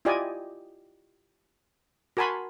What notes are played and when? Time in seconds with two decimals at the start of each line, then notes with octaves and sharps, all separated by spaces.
0.05 E4 F4 G4 D5 D#5 G#5
2.17 F#4 A#4 G#5 A5 B5 C6